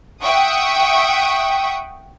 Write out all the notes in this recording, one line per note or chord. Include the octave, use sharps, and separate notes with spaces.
E5 F#5 G5 C#6 D#6